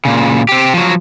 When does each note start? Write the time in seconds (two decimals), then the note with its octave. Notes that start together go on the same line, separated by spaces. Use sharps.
0.05 A#2 C#3
0.49 C4 G4
0.74 F3 F#3